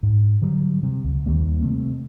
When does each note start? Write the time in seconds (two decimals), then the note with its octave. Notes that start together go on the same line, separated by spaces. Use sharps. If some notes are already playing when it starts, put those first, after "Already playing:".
0.03 G#2
0.42 D3 F#3 G3
0.83 C3
1.04 C#2
1.26 D#2 D#3 G3 A#3
1.61 C3 A3 C4